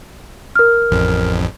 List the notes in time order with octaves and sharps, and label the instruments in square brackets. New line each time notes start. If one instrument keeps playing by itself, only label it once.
[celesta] A#4 F6
[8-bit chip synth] A1 F2